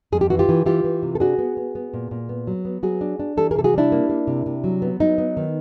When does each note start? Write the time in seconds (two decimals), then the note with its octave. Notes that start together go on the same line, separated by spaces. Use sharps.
0.12 F2 G#4
0.21 G4
0.30 E3 F#4
0.39 F4 G4
0.49 E3
0.66 E3 F4 G4
0.84 E3
1.03 C3
1.15 A4
1.20 D4 F#4 G#4
1.39 B3
1.57 B3
1.75 B3
1.94 A#2
2.11 A#2
2.29 B3
2.47 F#3
2.65 B3
2.83 F#3 F#4 G#4
3.01 D4
3.19 D4
3.37 E3 G4 A4
3.51 G#4 A#4
3.56 C3 A4
3.64 F#4 G#4
3.74 G3 D4 E4
3.92 A#3
4.09 A#3
4.27 C3
4.46 C3
4.64 F#3
4.82 B3
5.00 F#3 D#4
5.18 B3
5.37 D#3